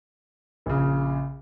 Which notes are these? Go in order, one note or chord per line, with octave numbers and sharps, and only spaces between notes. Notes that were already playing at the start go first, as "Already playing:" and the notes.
A#1 C#3